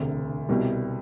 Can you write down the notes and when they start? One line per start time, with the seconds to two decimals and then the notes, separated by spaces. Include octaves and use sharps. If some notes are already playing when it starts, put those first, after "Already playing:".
Already playing: E1 D2 C3
0.49 C2 B2 G3